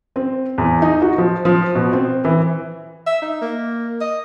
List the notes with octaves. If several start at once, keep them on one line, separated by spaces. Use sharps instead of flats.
C4
E2
D#4
F#4
F3
F3
B2
C4
E3
E5
D#4
A#3
D#5